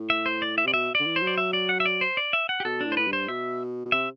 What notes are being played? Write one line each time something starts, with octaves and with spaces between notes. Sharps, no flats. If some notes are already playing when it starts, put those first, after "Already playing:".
Already playing: A2
E5
C5
D5
E5
C3 D5
B2 E5
D3 D5
E3
C5
F#3
D5
E5
D5
F#5
E5
D5
C5
D5
E5
F#5
G4
B2 A4
D4
A2
C5
A2 B4
G2
C5
B2 E5
B2
C3 E5